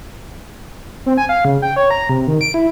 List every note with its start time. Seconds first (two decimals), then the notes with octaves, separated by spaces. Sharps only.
1.06 C4
1.18 G#5
1.29 F5
1.45 C#3
1.62 G5
1.76 C#5
1.90 A#5
2.09 C3
2.27 D#3
2.41 D7
2.54 E4